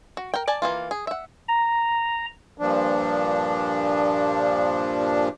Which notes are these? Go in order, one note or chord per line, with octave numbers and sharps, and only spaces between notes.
F#4
A#4 G5
D5 G#5 A5
E3 A#3 F4
G#4
E5 F#5
A#5
G2 A#2 F3 D4